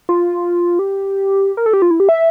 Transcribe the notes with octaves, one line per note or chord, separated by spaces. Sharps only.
F4
G4
A#4
A4
G4
F4
E4
G4
E5